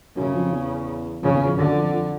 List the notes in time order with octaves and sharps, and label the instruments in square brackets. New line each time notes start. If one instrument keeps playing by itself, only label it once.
[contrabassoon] F#2 [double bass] C#3
[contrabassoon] F2
E2
[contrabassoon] F2 [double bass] C#3
[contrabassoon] E2
F2
[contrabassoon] F#2 [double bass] D3
[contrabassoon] F2
F2